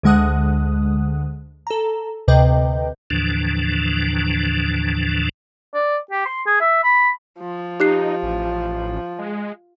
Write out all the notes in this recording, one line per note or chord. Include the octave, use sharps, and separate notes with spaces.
D2 D3 G#3 F#5 D#6 F#6
A4 A#5
D2 C3 B4 D#5 G5 G6
D#2 A2 D3 E3 F3 D4
D5
G4
C6
G#4
E5
B5
F3
D#4 G4 F#6 C7
A1
G#3